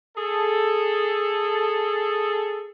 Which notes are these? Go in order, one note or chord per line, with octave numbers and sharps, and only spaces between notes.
G#4 A4